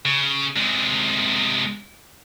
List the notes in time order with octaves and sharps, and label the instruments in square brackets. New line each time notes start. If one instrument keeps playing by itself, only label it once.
[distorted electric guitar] C#3
C3 G#3